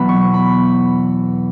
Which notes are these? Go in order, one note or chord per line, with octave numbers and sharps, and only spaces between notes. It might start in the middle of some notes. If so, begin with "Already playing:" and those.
Already playing: E2 B2 F#3 B3 B5
C#6
B5